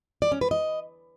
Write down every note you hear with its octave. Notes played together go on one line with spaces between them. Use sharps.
D5
C#4
B4
D#5